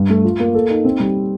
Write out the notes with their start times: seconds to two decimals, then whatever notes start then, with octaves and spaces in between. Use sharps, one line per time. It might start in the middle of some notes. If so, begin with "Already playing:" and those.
Already playing: G2
0.09 A3
0.24 F4
0.40 A#3
0.55 A4
0.70 D#4
0.85 C4
1.00 G3